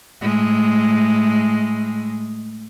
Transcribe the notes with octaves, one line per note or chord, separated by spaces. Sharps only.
A2 G#3